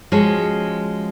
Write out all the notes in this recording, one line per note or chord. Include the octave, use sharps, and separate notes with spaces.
F3 G#3 C#4 F#4 C#5